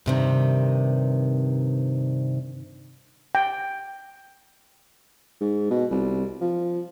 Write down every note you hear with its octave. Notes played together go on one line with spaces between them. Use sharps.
G2 C3 D#3
G5
G#2
B2
C2
F3